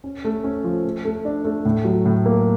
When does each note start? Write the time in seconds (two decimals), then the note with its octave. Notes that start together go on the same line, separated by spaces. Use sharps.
0.04 C#4
0.25 A3
0.44 C#4
0.64 F3
0.84 A3
1.05 A3
1.25 D4
1.45 A3
1.65 A2
1.85 F#3
2.05 A2
2.26 A#3